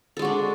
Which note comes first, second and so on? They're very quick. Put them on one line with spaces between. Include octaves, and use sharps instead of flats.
A4 G#3 F#4 D4